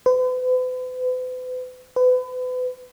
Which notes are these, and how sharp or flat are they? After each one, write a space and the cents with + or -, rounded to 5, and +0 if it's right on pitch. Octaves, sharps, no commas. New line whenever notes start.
B4 +45
B4 +35